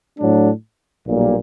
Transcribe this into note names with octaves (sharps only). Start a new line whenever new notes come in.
A2 F#3 A3 D4
B1 A#2 G3 A#3